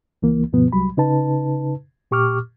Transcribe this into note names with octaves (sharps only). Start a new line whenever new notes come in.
C#2 E3 A#3
D2 G2 B2 F3 B3
C2 F#3 G3 B5
C#3 D#4 B4 A5
A#2 G4 C#6 D6 F6